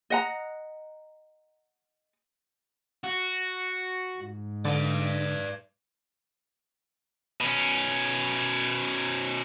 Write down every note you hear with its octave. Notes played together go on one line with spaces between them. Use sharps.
D#5 F#5 A#5
F#4
G#2
D3 B4 D5
B2 C#4